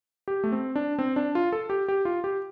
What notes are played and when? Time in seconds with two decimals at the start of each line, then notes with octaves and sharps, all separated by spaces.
0.28 G4
0.44 A3
0.52 C4
0.76 D4
0.99 C4
1.16 D4
1.35 F4
1.53 A4
1.70 G4
1.88 G4
2.05 F4
2.24 G4